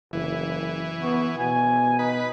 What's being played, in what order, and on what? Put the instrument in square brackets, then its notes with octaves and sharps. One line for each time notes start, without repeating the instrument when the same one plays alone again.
[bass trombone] F#1 [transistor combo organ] E3
[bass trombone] B3 [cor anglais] F#4
[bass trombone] B2 [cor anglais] G#5
[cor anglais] D#4 [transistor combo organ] B4